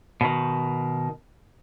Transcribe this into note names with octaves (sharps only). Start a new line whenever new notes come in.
B2 D#3